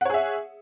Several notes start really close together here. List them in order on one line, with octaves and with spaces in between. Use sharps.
F#5 C#5 G#4 E5